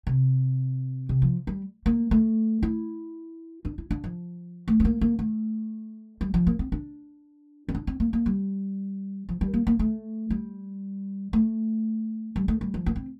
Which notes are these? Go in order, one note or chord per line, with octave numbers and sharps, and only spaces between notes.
C3
C3
F3
G3
A#3
A3
E4
D4
E4
D4
F3
A3
C4
A#3
A#3
A3
G3
F3
A#3
C4
D4
C4
D4
C4
A#3
A#3
G3
F3
G3
A#3
A#3
A3
G3
A3
G3
A3
G3
F3
A#3
C4